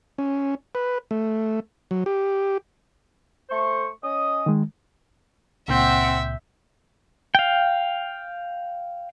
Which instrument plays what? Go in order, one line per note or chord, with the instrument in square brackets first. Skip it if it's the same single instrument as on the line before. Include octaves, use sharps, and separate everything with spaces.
[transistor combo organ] C#4
B4
A3
F#3
G4
[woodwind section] A3 C5 C#6
C#4 D#5 D#6
[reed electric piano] D#3 G#3
[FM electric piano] C#2 A#2 G6 [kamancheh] C4 F#5 [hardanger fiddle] E5
[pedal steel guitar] F5 G5